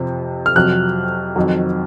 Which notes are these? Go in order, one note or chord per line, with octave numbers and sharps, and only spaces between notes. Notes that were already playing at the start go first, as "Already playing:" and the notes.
Already playing: F2 C3 F3
F6
F2 C3 F#3 F#6
F2 D#3 F#3